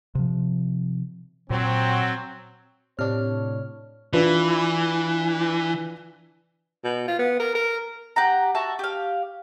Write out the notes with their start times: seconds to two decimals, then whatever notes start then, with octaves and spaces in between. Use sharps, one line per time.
0.15 C3 F3
1.50 A#2 F#3 C4
2.99 A2 C3 D4 C#5 F6
4.13 E3 D4 F4 B4
6.84 B2
7.08 F4
7.19 B3
7.39 A#4
7.55 A#4
8.16 G4 F#5 A#5
8.55 F#4 E5 A5
8.79 G4 F5